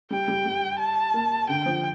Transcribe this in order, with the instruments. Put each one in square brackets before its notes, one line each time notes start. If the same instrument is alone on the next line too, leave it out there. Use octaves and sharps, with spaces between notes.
[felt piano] G3 [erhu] G5
[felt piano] G3
G3
[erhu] A5
[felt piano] A#3
[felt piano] D3 [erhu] G5
[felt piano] F3